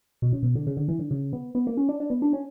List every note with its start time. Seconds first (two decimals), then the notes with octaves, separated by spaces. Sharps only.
0.22 B2
0.33 C#3
0.43 B2
0.55 D3
0.67 C#3
0.77 D3
0.88 E3
0.99 D3
1.11 C#3
1.33 B3
1.55 B3
1.67 A#3
1.77 C#4
1.89 D4
2.00 D4
2.10 B3
2.22 D4
2.33 C#4